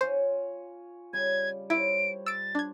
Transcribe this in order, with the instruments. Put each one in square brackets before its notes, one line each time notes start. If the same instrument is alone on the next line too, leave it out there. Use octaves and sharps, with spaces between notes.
[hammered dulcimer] F4 C#5 G#5 [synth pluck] C5
[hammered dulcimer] C#3 G3 [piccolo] G#6
[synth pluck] E4 [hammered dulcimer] C5 C#5 [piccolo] D7
[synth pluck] E6 D7 [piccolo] A6
[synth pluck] D4 G#6